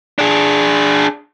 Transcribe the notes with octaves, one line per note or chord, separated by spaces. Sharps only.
D4 G#4